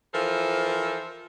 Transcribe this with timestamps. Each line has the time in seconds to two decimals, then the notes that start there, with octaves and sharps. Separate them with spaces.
0.14 E3 F3 A4 A#4 C5